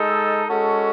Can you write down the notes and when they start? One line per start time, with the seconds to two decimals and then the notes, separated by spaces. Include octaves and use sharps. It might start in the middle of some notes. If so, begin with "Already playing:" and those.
Already playing: G#3 D#4 A4
0.48 G#3 C#4 F#4 A4